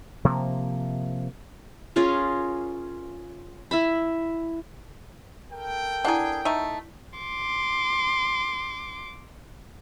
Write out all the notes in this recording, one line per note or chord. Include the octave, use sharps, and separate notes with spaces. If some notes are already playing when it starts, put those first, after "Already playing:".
C3 F3 A#3
C#4 F4 G#4 A#4
E4 E5 B5
A4 A#4 G5
D4 E4 G#4 D5 F#5
A3 D#4
C6 D6